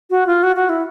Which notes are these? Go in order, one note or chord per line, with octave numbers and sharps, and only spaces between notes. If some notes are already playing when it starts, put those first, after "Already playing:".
F#4
F4
F#4
F#4
E4